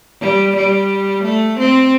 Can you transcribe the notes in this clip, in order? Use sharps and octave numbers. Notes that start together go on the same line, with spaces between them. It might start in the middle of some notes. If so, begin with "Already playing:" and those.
G3
G3
A3
C4